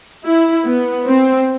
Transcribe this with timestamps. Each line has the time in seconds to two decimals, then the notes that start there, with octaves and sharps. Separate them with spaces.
0.24 E4
0.66 B3
1.07 C4